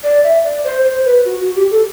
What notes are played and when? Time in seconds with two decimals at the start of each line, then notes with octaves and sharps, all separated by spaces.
0.04 D5
0.24 E5
0.44 D5
0.64 C5
0.84 C5
1.05 B4
1.25 F#4
1.41 F#4
1.56 G4
1.71 A4